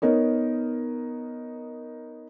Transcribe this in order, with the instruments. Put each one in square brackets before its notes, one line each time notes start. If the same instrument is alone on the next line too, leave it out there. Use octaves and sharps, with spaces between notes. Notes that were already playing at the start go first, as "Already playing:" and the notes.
[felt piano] B3 D#4 A#4 C#5